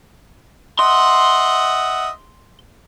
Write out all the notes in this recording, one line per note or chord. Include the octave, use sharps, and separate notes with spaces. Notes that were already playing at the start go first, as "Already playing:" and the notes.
D#5 E5 F#5 C6